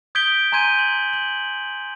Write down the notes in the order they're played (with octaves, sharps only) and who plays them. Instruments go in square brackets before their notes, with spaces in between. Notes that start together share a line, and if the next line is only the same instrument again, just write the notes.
[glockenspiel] D#6 G6 G#6 B6 D7 G7
G#5 A#5 C6 G6 G#6 D#7
F#7
F#7